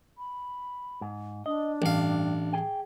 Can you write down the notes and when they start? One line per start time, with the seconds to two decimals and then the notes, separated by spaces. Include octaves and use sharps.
0.18 B5
1.01 G#2
1.46 D4 D#5
1.82 A1 G2 F5
2.53 G#4 G5